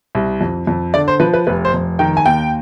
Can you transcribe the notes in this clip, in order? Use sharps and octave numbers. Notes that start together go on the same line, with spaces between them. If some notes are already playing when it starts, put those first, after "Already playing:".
C2
F2
F2
D3 D5
C5
F3 B4
B4
F1 B4
C5
F1
D#3 G5
G#5
D#2 G5